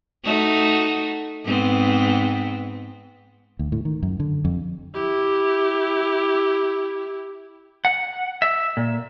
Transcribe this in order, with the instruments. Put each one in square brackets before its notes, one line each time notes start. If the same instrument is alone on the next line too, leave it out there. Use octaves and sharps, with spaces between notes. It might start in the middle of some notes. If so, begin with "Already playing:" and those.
[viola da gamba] A3 D#4 F#4
G#2 B3 C4
[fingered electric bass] D2
A2
D#3
F#2
D3
F2
[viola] E4 G4
[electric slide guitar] F#5
E5
A#2